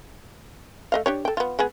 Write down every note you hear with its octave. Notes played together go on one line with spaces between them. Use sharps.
A3 D#5 F5
D4 G4 C#5
A4 G5
B3 F4
G#3 B3 G#4